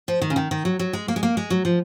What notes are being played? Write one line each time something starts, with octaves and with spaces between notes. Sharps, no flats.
F3
D#3
C#3
D#3
D#3
F#3
F#3
G#3
A#3
G#3
A#3
G#3
F#3
F3